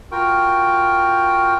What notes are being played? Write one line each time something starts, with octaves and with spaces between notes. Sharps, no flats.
F4 F#4 A#4 G5